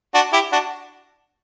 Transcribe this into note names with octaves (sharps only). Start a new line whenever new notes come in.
D4 F#4
E4 G4
D4 F#4